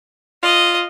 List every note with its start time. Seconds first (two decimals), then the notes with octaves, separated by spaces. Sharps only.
0.43 F4 D#5